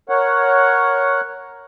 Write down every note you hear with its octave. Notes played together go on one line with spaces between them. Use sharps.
A#4 C#5 F#5